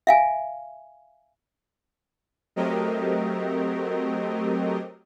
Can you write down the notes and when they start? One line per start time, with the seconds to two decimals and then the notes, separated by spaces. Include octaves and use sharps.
0.07 E5 F5 G#5
2.56 F#3 A3 C4 G4 A#4 D#5